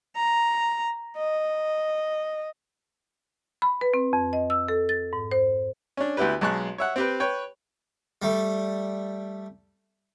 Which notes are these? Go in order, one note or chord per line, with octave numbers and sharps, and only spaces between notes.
A#5
D#5
B5
B4
C4
F2
D#5
E6
A4
A6
G#2
C5
C#4 D4
D2 B3 E4 G4 B4
B1 G#3 A5 C#6 F#6
C#5 E5 F#5
C4 G4 B4
B4 C#5 G5
G3 A3